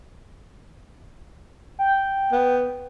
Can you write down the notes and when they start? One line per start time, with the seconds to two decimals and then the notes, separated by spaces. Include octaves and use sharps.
1.79 G5
2.32 B3